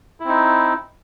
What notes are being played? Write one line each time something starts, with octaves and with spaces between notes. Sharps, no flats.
C4 D#4 E4